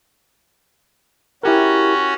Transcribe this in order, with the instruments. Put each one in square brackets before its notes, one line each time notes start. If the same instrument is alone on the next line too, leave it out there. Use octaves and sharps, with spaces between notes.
[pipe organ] C#4 F#4 [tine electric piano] E4 G4 A#4